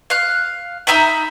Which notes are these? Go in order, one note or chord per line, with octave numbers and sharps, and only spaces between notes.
F5 F#6
D#4 E5 A#5 B5